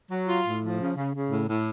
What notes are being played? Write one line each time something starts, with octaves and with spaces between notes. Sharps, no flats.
F#3
F4
A2
F3
C#3
C#3
C#3
A2
A2